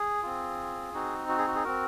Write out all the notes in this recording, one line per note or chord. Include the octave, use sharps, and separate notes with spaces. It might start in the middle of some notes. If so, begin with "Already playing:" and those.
Already playing: G#4
C4 F4
C4 D#4 F#4
F#4
G#4
F#4
G#4
C4 F#4 A#4